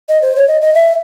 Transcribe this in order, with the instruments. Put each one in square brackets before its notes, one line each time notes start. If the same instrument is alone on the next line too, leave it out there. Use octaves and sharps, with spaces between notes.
[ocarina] D#5
C5
C#5
D#5
D#5
E5